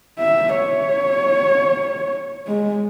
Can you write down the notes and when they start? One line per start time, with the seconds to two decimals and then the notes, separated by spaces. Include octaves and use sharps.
0.19 E5
0.59 C#5
2.47 G#3